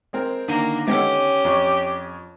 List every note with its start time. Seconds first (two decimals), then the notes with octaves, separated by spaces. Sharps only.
0.13 G#3 C4 A#4
0.48 D3 D#3 A#3
0.88 G#3 B3 C#4 G4 A4
1.45 F2 C#5